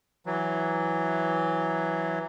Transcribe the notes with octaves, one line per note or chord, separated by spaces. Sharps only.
E3 F#3